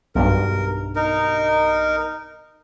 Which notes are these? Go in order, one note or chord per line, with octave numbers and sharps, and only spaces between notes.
B1 G2 A#4
D#4 A#4